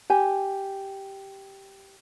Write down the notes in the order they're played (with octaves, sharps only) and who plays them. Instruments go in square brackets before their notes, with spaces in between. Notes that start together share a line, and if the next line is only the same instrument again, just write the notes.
[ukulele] G4 G#5